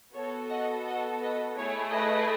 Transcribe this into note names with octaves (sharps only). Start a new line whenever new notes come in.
B3 F#4 A4 C#5
D#5 F#5
D#5 F#5
B4 D#5
A3 E4 G#4 C#5
B4 D#5